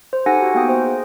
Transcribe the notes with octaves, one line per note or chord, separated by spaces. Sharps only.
C5
D#4 G4 A4 F#5 G#5 A#6
F#4
A#3 B3 G5 D#6 A#6
C5
G#4